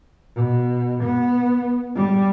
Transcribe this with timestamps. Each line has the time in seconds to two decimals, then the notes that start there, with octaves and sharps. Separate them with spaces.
0.36 B2
1.04 B3
1.96 G3